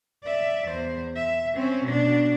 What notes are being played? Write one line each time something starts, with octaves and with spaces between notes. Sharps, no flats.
D5 E5
E2 C5
E5
C4 C#4
B2 D4